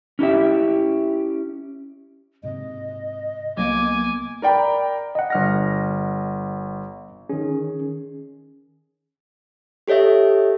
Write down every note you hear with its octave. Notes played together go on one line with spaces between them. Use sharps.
C#4 E4 G4 E5
G#2 C3 D#5
C2 F#3 A#3 B3 G#5 D6
A#4 D5 G5 A#5 B5
D#5 F#5
G1 F6 A#6
D#3 C#4 G#4
G4 A4 C#5 D#5 E5